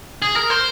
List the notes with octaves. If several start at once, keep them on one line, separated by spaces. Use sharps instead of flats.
G#4
A#4
C5